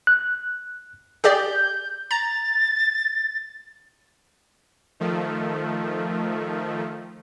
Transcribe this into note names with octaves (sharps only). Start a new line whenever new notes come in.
F#6
G4 G#4 D5 G6
A#5 A6
D#3 F3 A3